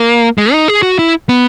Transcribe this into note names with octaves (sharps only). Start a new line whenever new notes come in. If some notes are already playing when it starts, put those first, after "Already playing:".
Already playing: A#3
G#3
D#4
G#4
F#4
E4
B3